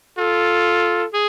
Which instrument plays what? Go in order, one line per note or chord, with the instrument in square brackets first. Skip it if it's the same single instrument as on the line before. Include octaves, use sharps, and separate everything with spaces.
[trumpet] F4 [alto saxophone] A4
[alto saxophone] G#4